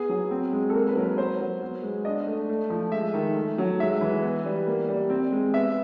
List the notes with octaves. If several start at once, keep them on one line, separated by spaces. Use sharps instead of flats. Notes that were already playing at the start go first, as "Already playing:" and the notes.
Already playing: B3 G#4
F#3
C4
G#3
A4
A#3 A#4
B4
F#3 A#4
B4
A#3 C5
F#3
B3
G#3
D4 D#5
A3
A3
F3
G#3 E5
D#3
A3
F#3
G#3 E5
E3
B3
G3
A#3
G3
C4
G#3
B3 E5